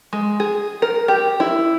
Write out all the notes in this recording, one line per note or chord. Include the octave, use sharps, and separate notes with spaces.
G#3
G#4
A#4
G4
E4